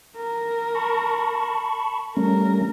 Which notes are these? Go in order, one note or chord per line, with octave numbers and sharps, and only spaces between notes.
A#4
A5 B5 C#6
G3 A3 C#4 A#4